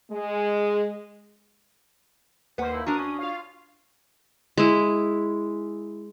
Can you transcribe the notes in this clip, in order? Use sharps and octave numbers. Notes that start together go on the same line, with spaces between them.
G#3
D#2 A#3 B4 C5 F#5
E4
D4 F#4 A#4 D#6
C#4
F4 C#5 F5
G#3 E4